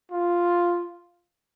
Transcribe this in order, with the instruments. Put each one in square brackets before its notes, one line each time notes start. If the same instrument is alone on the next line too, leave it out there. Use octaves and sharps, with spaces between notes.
[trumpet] F4